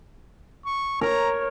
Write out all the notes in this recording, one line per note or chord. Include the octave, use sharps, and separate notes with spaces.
C#6
A#4 C#5 A#5